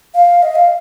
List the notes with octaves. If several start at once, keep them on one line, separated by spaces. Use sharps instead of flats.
F5
D#5
F5